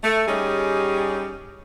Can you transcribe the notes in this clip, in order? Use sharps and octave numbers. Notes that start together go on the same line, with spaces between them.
A3
G3 C#4 D#4 G4 G#4